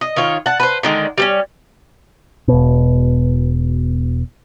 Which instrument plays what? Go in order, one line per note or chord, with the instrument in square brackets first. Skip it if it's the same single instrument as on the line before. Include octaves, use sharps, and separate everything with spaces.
[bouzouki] D#5
D#3 F4 C#5
F#5 A5
B4 C5
D3 D#3 G#3
G3 C4 C#4
[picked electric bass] E1 B2